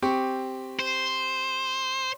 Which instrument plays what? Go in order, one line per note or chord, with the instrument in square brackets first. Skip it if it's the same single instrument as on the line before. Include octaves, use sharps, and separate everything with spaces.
[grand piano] C4 G4 C#6
[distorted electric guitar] C5